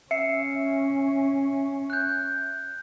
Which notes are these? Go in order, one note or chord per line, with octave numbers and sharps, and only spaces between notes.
C#4 E5 C7 C#7
F#6 G6